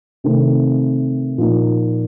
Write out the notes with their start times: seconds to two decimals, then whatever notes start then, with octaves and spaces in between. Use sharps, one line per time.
0.24 C3 D#3 A3 C4
1.38 A#2 F3 A#3 D#4